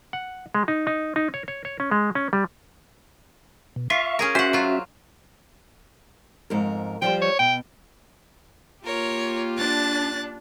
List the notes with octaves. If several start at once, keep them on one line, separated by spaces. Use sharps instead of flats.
F#5
G#3
D#4
D#4
D#4
C#5
C#5
C#5
C#4
G#3
C#4
G3
B2
F4 E5 F5 C#6
C#4 G#4 A#4
C#4 F#4 C5 E5 F#5
F#3 F4
F2 G#2 A#4
F3 G3 C5 G5
C#5
B2 G5
A#3 F4 G4 A#4 C#5
D4 F#6 A6